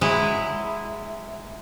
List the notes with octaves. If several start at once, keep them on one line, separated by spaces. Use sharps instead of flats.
F#3 G#3 E4